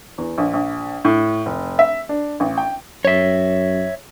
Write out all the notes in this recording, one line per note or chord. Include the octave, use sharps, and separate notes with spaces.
E2
A#1
A#1
A2
F1
E5
D4
A1
G5
F#2 C#5 E5